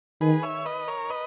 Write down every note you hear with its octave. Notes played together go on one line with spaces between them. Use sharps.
D#3 G#4 B4
C#5 E5
B4 D#5
A#4 C#5
B4 D#5